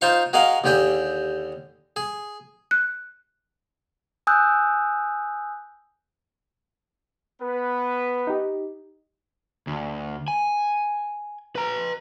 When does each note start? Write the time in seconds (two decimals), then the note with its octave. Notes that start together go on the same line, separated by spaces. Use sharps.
0.01 D#4 F4 C5 F5 C6 C#6
0.33 F#4 G#4 A#4 D#5 F5 F#5
0.64 D#2 D3 G4 G#4 G5
1.96 G#4
2.71 F#6
4.27 G#5 D#6 E6 F#6 G6
7.41 B3 B4
8.27 D#4 G4
9.67 D2
10.28 G#5
11.56 B4 A#5